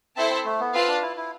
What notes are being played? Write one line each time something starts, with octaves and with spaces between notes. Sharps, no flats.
C4 E4 A4 C5 E5 A5
C4
A3
B3
C4 F4 B4 F5 A5
D4
E4
E4